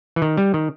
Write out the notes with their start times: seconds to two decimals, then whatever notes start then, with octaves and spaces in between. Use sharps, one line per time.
0.16 E3
0.22 D#3
0.37 G3
0.54 D#3